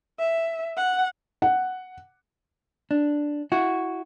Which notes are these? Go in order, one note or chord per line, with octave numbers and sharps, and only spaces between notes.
E5
F#5
F#5
D4
E4 F#4